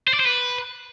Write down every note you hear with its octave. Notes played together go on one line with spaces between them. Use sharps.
C5
D5
C5
B4